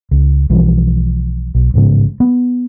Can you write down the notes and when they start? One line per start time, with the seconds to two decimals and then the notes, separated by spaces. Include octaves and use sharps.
0.11 C#2
0.50 B1 E3 F3 G3
1.55 B1
1.74 A1 G#2 C#3 G#3
2.20 B3